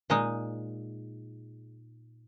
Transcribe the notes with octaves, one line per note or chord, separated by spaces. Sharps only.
A#2 G#3 D#4